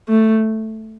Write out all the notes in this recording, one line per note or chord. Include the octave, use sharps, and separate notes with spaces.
A3